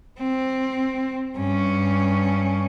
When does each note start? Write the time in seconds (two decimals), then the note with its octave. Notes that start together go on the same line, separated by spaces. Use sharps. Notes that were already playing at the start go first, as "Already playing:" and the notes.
0.19 C4
1.36 G2 C#4